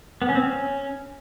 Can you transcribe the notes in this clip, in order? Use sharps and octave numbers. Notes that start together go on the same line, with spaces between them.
B3
C#4
C4
C#4